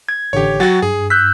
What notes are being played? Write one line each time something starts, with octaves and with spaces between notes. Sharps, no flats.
G#6
A1 D3 G4 C#5
F#3 F#4 F#5 G5 A6
G2 G#4
E6 F#6 G6 B6